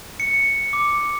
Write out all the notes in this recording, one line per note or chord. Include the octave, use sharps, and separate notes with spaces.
C#7
D6